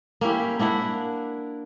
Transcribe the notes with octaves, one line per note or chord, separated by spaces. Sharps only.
A#3 C#4 E4 G4
A#3 D4 E4 F#5